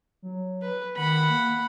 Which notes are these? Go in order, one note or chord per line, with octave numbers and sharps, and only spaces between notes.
F#3
B4
D#3 F#5 B5
A#3